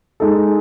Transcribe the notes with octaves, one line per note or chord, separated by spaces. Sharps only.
G#3 D#4 A4